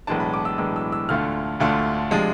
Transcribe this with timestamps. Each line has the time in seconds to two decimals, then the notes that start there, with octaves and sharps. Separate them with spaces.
0.07 B1 A2 E3 G#3 D4 A5
0.20 B5
0.34 D6
0.45 E6
0.58 B1 A2 E3 G#3 D4 E6
0.76 E6
0.92 E6
1.09 D2 D3 A3 D4 F4 F6
1.60 D2 D3 A3 D4 F4
2.11 C3 F3 G#3 D4